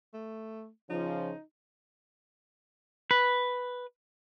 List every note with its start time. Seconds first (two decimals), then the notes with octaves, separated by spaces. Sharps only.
0.14 A3
0.90 C#3 F3 D#4
3.11 B4